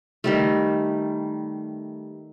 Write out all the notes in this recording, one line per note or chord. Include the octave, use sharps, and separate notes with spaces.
D#3 G3 A3